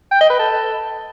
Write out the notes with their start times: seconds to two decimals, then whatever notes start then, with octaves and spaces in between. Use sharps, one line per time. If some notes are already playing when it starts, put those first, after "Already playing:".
0.12 G5
0.21 D#5
0.30 B4
0.39 A4